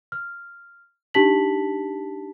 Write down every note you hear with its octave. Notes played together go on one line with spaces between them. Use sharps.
F6
D4 D#4 G4 A5 B6 F#7